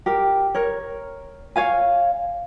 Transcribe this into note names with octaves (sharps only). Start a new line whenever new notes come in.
G4 A#4
A#4 C#5
C#5 F5 G#5